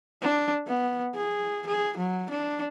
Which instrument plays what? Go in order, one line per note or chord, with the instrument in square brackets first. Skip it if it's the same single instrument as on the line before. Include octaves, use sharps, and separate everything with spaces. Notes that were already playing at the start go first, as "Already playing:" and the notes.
[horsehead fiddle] D4
B3
G#4
G#4
F#3
D4